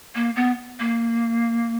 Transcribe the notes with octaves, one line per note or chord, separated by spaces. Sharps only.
A#3
B3
A#3